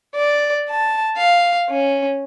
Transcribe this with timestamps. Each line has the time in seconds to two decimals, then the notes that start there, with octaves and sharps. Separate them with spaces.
0.15 D5
0.70 A5
1.17 F5
1.70 C#4